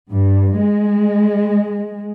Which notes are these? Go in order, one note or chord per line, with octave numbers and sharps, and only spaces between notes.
G2
G#3